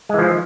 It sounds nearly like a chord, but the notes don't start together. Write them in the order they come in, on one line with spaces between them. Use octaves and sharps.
G#3 E3 F3